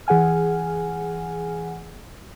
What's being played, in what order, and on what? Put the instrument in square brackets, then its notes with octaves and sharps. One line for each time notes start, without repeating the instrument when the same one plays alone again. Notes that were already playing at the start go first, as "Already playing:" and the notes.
[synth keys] E3 G#4 F#5 G#5 F6